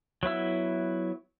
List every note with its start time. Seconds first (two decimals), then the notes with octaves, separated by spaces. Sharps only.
0.23 F#3 B3 E4 E6